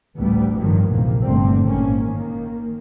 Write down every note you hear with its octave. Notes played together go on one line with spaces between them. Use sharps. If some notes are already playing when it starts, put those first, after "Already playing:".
A1 D2 G3 B3
G2 D#3 F3 F#3
A#1 E2 G#2 C3 A#3
G1 D3 A3 C4
G#1 A#2 A#3 C#4
D#3 A#3